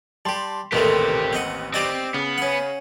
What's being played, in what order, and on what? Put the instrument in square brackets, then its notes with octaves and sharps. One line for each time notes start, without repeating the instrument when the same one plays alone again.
[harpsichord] G3 G4 [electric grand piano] A5 C6
[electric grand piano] A1 D#2 B4 [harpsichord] A#2 D#3 A3 [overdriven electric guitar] G4 C5
[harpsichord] C4 D#5 F#5
[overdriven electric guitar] C4 [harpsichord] G4 D5 D#5
[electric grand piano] C#3 [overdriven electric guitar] B3
[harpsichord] C#4 F#5